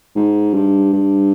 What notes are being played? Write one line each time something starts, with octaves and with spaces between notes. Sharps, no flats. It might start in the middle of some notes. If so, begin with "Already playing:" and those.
G#2
G2
G2